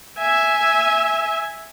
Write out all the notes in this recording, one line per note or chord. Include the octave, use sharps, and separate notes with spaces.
E5 G#5